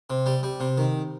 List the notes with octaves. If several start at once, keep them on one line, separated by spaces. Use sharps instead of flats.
C3
G3
G3
C3
D#3